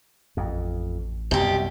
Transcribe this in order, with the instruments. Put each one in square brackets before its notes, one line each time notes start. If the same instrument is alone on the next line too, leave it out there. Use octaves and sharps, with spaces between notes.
[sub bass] A1 [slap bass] F2
[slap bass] C2 F#2 [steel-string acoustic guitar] B2 G4